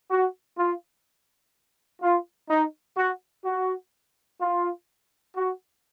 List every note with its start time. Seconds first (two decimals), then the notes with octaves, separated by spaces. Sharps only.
0.11 F#4
0.58 F4
2.02 F4
2.50 D#4
2.97 F#4
3.45 F#4
4.41 F4
5.36 F#4